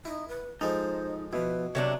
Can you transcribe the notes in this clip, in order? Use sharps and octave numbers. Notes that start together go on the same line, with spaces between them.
D#4 E4
B4
F3 G#3 D#4 A4 C5
B2 F3 B3 E4 B4
C3 F#3 D4 C#5 D5